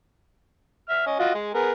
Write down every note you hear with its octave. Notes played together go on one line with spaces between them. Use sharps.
E5 F6
C#4 D#5
F4 F#4 D#5
G#3 G#4
B3 G#4 A#4